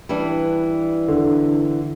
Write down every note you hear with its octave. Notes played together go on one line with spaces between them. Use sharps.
E3 G3 D4
D3